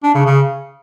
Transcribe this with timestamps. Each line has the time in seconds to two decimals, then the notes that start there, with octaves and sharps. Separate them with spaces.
0.03 D4
0.14 C#3
0.26 C#3